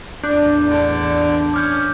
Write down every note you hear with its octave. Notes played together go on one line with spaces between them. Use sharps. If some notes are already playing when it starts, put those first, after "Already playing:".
A1 E2 D4 D6 G6
D3
C#4 D6 F6 G6